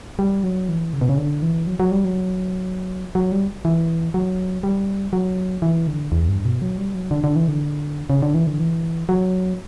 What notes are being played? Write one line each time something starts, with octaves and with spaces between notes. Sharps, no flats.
G3
F#3
E3
C#3
B2
C#3
D3
E3
F#3
F#3
G3
F#3
F#3
G3
E3
F#3
G3
F#3
E3
D3
E2
G2
B2
F#3
G3
F#3
D3
D3
E3
D3
C#3
D3
E3
D3
E3
F#3